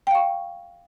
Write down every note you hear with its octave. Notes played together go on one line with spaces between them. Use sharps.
F5 G5 C#6